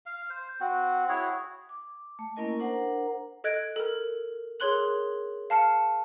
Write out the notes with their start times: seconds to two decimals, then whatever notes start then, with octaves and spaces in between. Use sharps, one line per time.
0.06 F5
0.30 C5
0.60 C4 F#4
1.09 E4 F#4 G#4 C#5
1.69 D6
2.19 A3
2.36 A#3 C#4 E4 A#4 D#5 G#5
2.60 D4 A#4 C5 F#5 A#5
3.44 A4 D#5 F#6 G#6 D7
3.76 A4 A#4
4.60 G#4 A#4 C#5 C6 F#6 F#7
5.50 F5 A5 F6 C#7